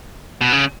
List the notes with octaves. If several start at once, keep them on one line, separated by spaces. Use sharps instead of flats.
B2
C#3